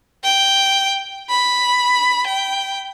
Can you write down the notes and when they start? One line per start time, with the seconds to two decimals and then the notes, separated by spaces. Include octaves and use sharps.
0.24 G5
1.30 B5
2.27 G5